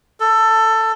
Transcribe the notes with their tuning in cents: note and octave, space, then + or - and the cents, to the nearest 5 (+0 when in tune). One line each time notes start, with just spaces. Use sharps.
A4 +15